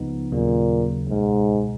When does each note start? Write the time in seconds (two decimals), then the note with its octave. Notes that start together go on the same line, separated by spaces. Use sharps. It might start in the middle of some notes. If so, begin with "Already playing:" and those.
Already playing: C#2 C#3 F3 B3 D#4
0.31 D#2 A#2 C#3 F#3 A#3
1.09 C#2 G#2 B2 G#3